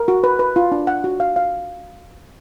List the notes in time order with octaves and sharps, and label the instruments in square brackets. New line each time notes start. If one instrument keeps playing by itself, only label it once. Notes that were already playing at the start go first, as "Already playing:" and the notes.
Already playing: [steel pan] A#4
F#4
B4
B4
F4
D4
F#5
F#4
F5
F5